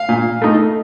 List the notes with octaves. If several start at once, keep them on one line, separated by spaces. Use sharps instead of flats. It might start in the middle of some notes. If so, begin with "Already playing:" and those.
Already playing: F5
A#2
A3 D#4